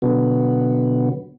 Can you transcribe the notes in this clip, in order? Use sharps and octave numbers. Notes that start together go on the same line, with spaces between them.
B2 D3 F#3 B3